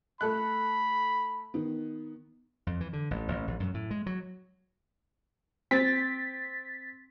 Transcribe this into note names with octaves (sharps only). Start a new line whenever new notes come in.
A3 A4 B5 F#6
D#3 B3
F2
E3
D3
A1
A1
A#1
F#2
A2
G#3
F#3
C4 A6 B6